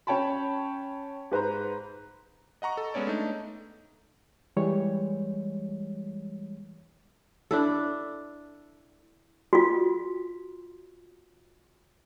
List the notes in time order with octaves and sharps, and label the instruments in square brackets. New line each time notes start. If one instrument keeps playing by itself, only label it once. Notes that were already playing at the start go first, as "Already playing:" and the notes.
[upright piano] C#4 C#5 G5 A5 B5
G#2 B4 C5 A#5
[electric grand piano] D#5 F#5 A#5 C#6
A4
G#3 B3 C#4 C#5 D5
A3 D4 D#4
[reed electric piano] E3 G3 G#3 C#5
[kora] D4 E4 A4
[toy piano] F4 F#4